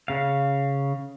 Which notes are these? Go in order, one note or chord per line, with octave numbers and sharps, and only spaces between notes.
C#3 F5